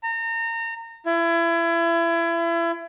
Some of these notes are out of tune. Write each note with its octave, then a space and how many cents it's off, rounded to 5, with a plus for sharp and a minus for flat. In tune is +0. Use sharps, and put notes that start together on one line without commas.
A#5 -30
E4 +30